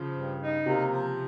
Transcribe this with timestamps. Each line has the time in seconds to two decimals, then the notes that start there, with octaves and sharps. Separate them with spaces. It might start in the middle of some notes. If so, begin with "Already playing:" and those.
Already playing: C#3 F3
0.17 G2
0.42 D#4
0.66 C3 A#3
0.92 F3